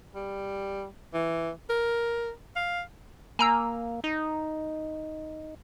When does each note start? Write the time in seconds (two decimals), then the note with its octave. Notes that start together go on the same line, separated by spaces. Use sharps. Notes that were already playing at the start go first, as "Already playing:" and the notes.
0.15 G3
1.13 E3
1.70 A#4
2.56 F5
3.39 A#3 G#5 A#5 E6
4.04 D#4